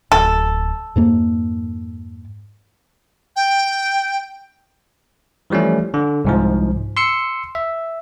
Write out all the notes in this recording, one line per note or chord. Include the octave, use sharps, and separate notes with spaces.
D1 A4
F2 G#2 A#3
G5
E3 F3 G3 A3 C#4
D3
C2 G#2 F3
C6 E6 C#7
E5